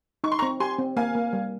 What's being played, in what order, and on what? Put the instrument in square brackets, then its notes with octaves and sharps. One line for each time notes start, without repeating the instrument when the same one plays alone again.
[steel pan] D#4 [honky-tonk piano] C#6
[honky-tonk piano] C6
A#5 C#6
[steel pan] C4
[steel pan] G4 [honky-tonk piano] G#5 C6
[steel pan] C4
[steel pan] A#3 [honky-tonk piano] F5 G#5
[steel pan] A#3
G3